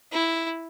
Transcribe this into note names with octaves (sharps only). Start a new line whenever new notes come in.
E4